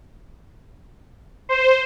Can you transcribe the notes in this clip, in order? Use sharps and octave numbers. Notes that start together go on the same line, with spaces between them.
C5